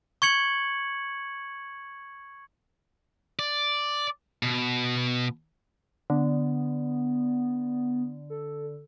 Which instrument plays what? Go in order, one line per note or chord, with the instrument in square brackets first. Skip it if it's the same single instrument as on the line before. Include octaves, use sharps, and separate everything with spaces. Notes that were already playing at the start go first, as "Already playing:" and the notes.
[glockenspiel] C#6 G#6 C#7 F#7
[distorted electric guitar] D5
B2
[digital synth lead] D3 [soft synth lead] B3
[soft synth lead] A4